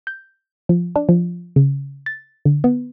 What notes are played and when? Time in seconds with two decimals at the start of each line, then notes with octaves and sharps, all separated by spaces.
0.07 G6
0.69 F3
0.96 D4
1.09 F3
1.56 C#3
2.06 A6
2.45 D3
2.64 B3